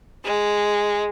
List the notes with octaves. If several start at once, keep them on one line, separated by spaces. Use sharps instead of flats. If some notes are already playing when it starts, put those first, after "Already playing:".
G#3